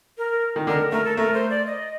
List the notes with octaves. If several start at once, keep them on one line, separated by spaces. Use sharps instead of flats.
A#4
D#3
D3 A#4
A3 A#4
A4
A3 A#4
C5
D5
D#5